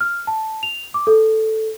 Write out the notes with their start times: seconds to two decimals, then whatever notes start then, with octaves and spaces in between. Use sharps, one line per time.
0.01 F6
0.27 A5
0.63 F7
0.94 D6
1.07 A4